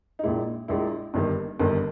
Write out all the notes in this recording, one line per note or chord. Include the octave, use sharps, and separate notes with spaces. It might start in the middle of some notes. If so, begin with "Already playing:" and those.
D#4
A#1 A#2 G#3 E4
A#1 A#2 G#3 E4
G1 G2 D#3 A#3
G1 G2 D#3 A#3